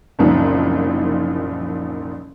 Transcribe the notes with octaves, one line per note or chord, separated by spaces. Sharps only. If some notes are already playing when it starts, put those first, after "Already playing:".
F#1 C2 A#2 D#3 F3